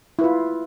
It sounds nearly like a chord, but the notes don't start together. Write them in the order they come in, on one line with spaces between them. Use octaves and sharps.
E4 B4 F4